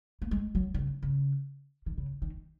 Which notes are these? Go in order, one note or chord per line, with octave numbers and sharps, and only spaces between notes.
A#3
G#3
F#3
D#3
C#3
C#3
D#3
C#3
D#3